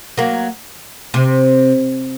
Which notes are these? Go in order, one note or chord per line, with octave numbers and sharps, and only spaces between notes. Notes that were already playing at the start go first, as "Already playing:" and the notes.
F#3 A#3
C3